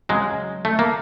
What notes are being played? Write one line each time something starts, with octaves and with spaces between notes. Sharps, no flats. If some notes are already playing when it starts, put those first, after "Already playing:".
C#3 F#3 G#3
A3
A#3